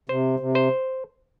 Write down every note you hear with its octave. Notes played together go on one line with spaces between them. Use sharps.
C3 C5
C3
C5